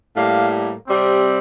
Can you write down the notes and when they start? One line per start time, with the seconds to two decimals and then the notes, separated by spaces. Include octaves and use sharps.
0.15 A2 G3 A#3 F5
0.87 C3 G3 C4